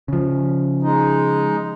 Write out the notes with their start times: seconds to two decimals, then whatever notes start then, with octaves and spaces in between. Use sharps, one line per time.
0.08 C#3 F3
0.83 G#3 D#4